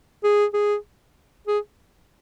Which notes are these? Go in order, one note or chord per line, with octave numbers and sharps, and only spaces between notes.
G#4
G#4
G#4